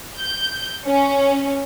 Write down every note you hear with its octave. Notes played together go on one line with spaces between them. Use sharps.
G6
C#4